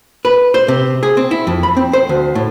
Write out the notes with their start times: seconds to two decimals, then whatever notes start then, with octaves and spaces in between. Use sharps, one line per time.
0.25 B4
0.54 C5
0.68 C3
1.03 G#4
1.17 C4
1.31 E4
1.47 F2
1.63 B5
1.77 C4
1.93 C5
2.09 D2
2.35 A2